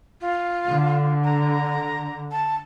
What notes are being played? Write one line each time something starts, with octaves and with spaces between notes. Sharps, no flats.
F4
D3
A#5
A5